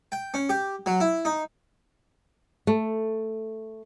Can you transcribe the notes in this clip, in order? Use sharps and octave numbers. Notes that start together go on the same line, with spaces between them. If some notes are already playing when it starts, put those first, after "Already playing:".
G5
C#4
G4
F#3
E4
D#4
A3